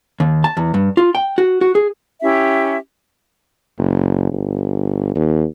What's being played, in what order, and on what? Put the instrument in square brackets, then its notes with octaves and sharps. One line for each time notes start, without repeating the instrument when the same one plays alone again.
[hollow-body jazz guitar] D#2
A5
E2
G2
F4
G5
F#4
F#4
G#4
[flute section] C#4 E4 G4 E5
[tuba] F#1
G1
D#2